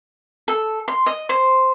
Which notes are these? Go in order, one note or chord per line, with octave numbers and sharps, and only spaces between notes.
A4
C6
D#5
C5